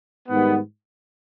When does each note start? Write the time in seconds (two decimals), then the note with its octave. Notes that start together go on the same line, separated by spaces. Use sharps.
0.28 G#2 D#3 G3 B3